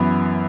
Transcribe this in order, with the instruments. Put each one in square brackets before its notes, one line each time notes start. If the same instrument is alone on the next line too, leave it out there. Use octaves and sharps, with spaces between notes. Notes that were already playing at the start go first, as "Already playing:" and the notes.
Already playing: [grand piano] F#2 E3 B3